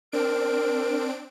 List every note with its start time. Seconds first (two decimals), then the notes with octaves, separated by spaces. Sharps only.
0.12 C4 D4 A#4 D7